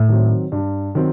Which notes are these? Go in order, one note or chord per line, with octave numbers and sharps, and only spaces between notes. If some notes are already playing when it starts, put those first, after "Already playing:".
Already playing: A2
D#3 F#3 C4
G2
D#3 F#3 C4